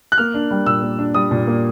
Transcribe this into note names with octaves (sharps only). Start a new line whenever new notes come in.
F#6
A#3 F6
D4
G3
A#2 E6
A#3
D4
G3 D#6
A#2
A#3